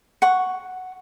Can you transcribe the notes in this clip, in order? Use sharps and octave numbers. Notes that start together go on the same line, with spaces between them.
F#5 C#6